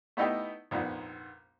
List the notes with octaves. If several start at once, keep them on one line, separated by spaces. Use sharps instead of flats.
A3 B3 D#4 E4 G4
A#1 F2 G#2 B3